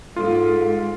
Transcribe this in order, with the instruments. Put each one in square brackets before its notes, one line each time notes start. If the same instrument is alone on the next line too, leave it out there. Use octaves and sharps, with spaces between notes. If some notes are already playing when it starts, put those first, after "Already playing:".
[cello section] G#2 [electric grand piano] F4 [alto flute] A4